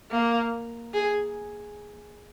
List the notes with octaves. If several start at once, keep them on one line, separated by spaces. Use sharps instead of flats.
A#3
G#4